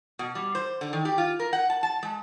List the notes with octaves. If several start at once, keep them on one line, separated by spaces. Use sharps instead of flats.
B2
G3
C5
D3
D#3
G4
F4
A#4
F#5
A5
A5
G#3